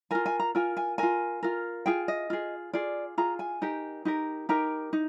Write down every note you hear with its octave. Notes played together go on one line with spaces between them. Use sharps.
F4 A#4 G#5
G#5
A#5
F4 A#4 G#5
G#5
F4 A#4 G#5
F4 A#4
F4 G#4 G5
D#5
F4 G#4
F4 G#4 D5
F4 G#4 A#5
G#5
D#4 G4 A#4
D#4 G4 A#4
D#4 G4 A#4 A#5
D#4